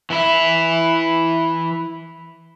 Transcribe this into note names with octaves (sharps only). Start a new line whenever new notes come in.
E3 E4